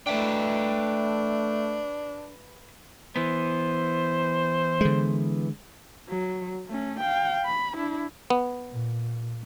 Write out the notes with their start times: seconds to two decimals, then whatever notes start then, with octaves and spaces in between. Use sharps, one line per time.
0.07 A3 D4 B4 E5 G5
3.16 E3 B3 C5
4.81 D3 G#3
6.08 F#3
6.68 A3 C#4
7.00 F5 G5
7.45 B5
7.77 D4 E4
8.30 B3
8.71 A#2